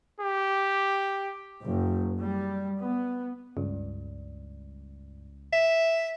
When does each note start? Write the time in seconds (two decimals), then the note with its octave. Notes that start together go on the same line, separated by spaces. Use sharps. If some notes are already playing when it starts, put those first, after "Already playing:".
0.21 G4
1.64 F#1
2.19 G3
2.81 B3
3.57 C#2 G2
5.53 E5